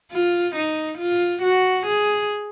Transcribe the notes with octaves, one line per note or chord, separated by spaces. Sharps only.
F4
D#4
F4
F#4
G#4